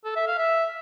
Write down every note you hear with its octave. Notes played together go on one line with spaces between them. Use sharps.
A4
E5
F5
E5